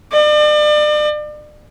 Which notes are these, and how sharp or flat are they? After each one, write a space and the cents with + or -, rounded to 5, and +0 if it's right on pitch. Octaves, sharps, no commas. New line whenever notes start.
D5 +40